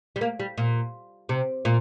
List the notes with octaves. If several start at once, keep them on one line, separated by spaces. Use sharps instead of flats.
G3
A#3
G3
A#2
C3
A#2